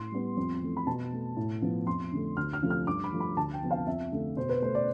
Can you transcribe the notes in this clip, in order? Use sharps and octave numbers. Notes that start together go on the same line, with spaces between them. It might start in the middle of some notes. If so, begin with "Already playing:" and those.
Already playing: A2 C6
G3 B3
F2
E3 A3
B5
B2 A5
A3
A2
F3 B3
F2 C6
D3 A3
D2 F6
F6
C3 F3 A3
F6
G2 D6
B5
F3 A3
B5
D2 A5
G5
C3 F3 B3
F5
F2 E5
D3 A3
B2 C5
B4
A3 C5
D5